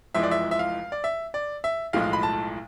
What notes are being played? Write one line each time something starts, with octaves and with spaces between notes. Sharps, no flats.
F1 F2 E3 G#3 E5
D5
E5
E5
F5
D5
E5
D5
E5
B1 A2 F3 G#3 F5
B5
A5